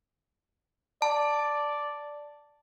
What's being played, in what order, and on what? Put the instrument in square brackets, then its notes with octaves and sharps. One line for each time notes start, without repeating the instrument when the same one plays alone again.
[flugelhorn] D5 [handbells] A5